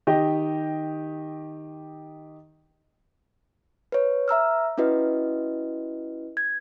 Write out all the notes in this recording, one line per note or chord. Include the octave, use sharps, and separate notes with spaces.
D#3 G4 D#5
B4 C#5
E5 A#5 E6 F6
C#4 E4 F#4 B4 D#5
G#6